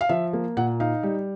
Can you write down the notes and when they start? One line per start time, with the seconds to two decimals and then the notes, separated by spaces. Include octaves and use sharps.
0.01 F5
0.09 F3 E5
0.33 A#3
0.57 A#2 F#5
0.80 D#4 F5
1.03 G3